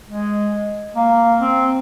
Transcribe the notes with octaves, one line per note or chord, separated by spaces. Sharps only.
G#3
A#3
C4